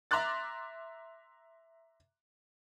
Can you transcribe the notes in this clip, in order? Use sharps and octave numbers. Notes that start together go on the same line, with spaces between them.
E5 A#5 C6 D6 F#6 A6